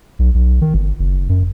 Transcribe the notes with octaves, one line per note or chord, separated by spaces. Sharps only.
B1
B1
D#3
G1
F#1
F#2